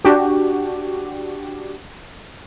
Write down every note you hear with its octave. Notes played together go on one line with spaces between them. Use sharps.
D4 F#4 G4